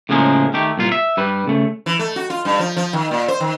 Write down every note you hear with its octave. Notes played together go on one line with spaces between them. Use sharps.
A2 C#3 F3 G#3 A#3 C#4
D#3 A3 G4
C2 A#2 F4
E5
G2 G3 B4
C#3 A3
E3
A3
F#4
F4
G2
F3
F3
D#3
A#2
C5
D#3